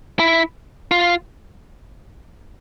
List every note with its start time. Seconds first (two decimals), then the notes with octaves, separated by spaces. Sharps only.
0.20 E4
0.91 F4